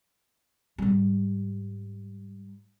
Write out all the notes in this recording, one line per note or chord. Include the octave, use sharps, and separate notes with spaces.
G#2 G3